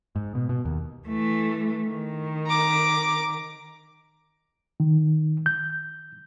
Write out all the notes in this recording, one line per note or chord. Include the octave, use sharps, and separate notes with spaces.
G#2
B2
B2
D#2
E3 A3
D#3
A#5 D6
D#3
G6